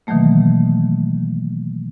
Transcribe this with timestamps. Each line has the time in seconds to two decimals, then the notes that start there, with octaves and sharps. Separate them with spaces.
0.07 B2 D#3 E3 F#3 A3 A#3